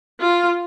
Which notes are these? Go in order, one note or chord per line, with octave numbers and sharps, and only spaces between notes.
F4